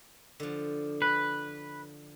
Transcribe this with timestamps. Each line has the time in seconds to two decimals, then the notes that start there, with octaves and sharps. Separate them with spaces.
0.40 D3 F3
1.02 B4